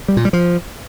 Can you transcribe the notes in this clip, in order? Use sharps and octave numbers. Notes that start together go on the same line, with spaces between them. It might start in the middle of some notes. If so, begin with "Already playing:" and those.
G3
A#2
G3
F3